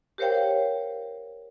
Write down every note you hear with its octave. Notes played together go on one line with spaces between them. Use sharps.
G4 A#4 C5 C#5 F5 G5